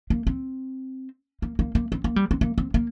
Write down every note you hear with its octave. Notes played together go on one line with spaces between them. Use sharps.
A#3
C4
A#3
A#3
A#3
C4
A#3
G3
C4
A#3
C4
A#3